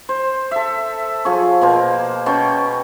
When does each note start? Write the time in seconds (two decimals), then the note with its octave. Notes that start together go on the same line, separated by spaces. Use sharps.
0.09 C5
0.51 A4 E5
1.25 F3 G#4 C#6
1.61 B2 A#3 C5
2.26 B2 C#4 G5 C#6